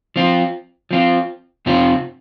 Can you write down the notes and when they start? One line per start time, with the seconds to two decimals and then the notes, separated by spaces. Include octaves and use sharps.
0.16 F3 C4 F4
0.91 F3 C4 F4
1.66 F2 C3 F3 C4 F4